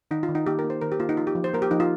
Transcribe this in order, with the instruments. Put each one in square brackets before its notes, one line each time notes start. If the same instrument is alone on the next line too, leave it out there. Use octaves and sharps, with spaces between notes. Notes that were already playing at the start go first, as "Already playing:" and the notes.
[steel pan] D#3 D#4
F4
D#3
D#4
A#3 G4
A#4
A#3
C5
D#3 A#4
G4
A#3 F4
D#4
F3 F4
G4
F3
C5
A#3 A#4
G4
F3 D#4
F4